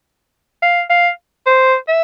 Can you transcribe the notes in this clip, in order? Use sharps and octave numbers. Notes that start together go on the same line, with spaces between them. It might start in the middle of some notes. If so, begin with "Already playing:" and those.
F5
F5
C5
E5